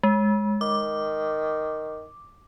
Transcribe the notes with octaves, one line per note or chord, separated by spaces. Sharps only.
G#3
D#3 D6